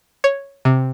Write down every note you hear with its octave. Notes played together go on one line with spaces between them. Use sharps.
C#5
C3